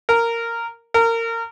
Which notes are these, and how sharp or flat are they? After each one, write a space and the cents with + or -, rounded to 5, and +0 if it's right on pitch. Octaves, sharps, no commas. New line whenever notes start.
A#4 -10
A#4 -25